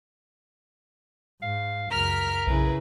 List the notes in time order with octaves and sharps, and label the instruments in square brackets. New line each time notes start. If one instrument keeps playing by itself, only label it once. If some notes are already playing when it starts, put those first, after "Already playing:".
[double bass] G#2 [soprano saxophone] F5
[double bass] C#2 F#2 [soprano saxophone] A#4 [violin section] F6 B6
[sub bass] B1 [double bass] C#3 E4 [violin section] G#4 B4